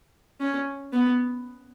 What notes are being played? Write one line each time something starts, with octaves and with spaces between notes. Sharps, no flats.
C#4
B3